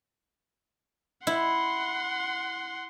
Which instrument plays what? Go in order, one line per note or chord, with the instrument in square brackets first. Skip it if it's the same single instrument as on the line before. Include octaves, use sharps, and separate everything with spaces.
[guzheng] E4 [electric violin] F#5 C6